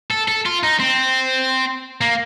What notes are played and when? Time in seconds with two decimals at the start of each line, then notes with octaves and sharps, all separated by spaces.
0.11 A4
0.28 A4
0.46 F4
0.63 D#4
0.80 C4
2.01 A#3